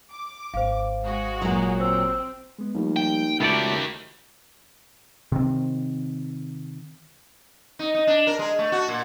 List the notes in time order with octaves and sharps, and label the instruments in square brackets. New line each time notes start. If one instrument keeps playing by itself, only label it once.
[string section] D6
[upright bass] G#1 [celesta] C5 F5
[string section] G#3 F#4
[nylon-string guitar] A#2 F#3
[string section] C4 [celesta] C5 E6
[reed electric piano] G#3 B3
[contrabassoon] D#2 [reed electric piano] F3 G3 A3
[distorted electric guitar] G5
[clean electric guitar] C#2 A3 D5 [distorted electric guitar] D#3 G4 [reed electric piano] F#4 B5
[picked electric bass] C3 D#3 C4
[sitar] D#4
D#4
D4
A#4
G#3
A3
F#4
A#2